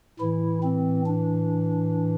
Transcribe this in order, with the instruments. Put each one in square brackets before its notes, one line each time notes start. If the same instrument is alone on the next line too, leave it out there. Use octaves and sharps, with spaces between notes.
[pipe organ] A2 E3 E4
C4
D4